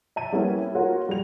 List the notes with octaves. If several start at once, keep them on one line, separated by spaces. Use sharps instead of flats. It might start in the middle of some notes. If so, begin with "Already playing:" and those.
E5 A5 D#7
G3 A#3 B3 C#4 E4
F4 F#4 A#4 C#5
G3 F7